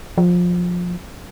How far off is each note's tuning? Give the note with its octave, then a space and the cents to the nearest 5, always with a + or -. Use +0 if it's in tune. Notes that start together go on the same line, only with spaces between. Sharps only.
F3 +20